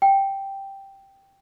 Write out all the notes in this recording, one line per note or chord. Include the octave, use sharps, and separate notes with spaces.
G5